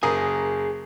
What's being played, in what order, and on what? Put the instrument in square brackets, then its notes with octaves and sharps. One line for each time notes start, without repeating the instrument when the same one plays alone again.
[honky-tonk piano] F#1 A#4 D#6 [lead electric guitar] G#4 G#5